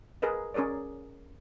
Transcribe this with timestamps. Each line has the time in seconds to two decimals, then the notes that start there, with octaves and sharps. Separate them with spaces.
0.22 G#4 A#4 B4 D#5
0.54 C#4 G#4 A#4 C#5 D5